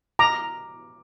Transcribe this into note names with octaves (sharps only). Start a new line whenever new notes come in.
A#5 D6